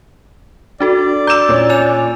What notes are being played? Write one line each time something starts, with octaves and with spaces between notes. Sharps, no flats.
D4 F#4 A4 D5
A#5 D6 E6 G6 E7
A#2 C#4
C#5 G#5 F7